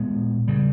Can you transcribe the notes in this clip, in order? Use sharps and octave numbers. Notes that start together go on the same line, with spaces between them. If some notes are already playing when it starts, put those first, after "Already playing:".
Already playing: A#2 G#3 B3
C#3 G3